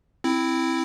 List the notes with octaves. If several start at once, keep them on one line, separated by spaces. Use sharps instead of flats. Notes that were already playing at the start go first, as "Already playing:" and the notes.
C4 E4